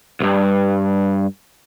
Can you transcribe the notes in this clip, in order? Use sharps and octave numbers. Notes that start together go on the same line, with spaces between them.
B1 G2